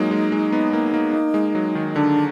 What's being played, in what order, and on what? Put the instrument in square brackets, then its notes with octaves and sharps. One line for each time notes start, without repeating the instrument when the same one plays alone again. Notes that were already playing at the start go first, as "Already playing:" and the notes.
Already playing: [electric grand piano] F#3 G#3 A#3 [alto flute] D#4
[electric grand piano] G#3
G#3
B3
A#3
A#3
A#3
G#3
F#3
D#3
[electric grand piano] D3 [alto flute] D4